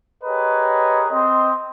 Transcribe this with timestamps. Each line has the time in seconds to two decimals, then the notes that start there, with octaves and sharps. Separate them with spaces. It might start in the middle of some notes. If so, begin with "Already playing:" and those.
0.23 G4 G#4 A#4 B4 C#5 D#5
1.10 C4 D#5 C6